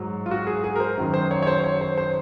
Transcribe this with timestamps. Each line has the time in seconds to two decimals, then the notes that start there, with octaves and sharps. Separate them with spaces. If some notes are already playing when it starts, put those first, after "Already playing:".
Already playing: G#2 F#3
0.26 F4
0.31 F#4
0.47 G#4
0.64 G#4
0.76 A#4
0.80 C5
0.97 F#2 D#3 F#3
1.14 C5
1.31 C#5
1.42 C#5
1.47 C5
1.64 C#5
1.81 C5
1.98 C5